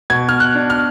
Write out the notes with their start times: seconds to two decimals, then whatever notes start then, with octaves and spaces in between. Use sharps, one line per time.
0.10 B2 G#6
0.29 F6
0.40 F#6
0.55 D4
0.70 F6